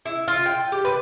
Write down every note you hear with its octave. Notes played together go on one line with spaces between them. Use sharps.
E4
F4
G5
G4
B4